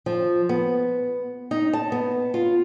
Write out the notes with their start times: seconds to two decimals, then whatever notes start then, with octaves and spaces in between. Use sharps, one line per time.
0.06 F3
0.49 B3
1.51 D#4
1.73 A5
1.92 B3
2.34 F4